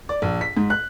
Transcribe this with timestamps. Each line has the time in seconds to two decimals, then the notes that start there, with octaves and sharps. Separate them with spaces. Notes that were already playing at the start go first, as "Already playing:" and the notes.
0.09 D5
0.22 A#1
0.41 B6
0.57 G#2
0.70 F#6